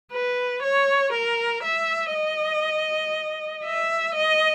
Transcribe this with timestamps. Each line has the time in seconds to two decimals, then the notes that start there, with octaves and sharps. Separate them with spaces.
0.12 B4
0.63 C#5
1.13 A#4
1.63 E5
2.14 D#5
3.65 E5
4.14 D#5